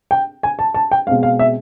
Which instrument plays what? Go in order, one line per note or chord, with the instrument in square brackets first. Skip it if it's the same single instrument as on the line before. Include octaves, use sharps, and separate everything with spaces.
[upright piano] G5
G#5
A5
A5
G5
B2 G#3 C4 F5
F5
E5